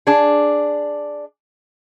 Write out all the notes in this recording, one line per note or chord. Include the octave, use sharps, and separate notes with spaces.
D4 G#4